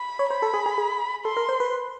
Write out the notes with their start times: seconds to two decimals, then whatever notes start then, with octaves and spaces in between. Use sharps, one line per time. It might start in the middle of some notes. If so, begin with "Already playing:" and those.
Already playing: B5
0.19 C#5
0.30 C5 B5
0.42 A4
0.54 G#4
0.66 G#4
0.78 G#4
1.25 A4 C6
1.37 A#4
1.49 C5
1.60 B4